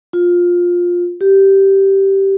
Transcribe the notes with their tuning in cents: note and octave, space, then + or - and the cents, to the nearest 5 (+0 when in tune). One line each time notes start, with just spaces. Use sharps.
F4 +15
G4 -10